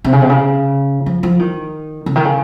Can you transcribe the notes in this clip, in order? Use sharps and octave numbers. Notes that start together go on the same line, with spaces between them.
C3
C#3
C3
C#3
F3
F3
D#3
C#3
D#3
C#3